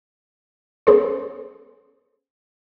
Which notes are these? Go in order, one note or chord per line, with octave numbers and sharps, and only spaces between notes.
B3 C#4 G#4 A4 C5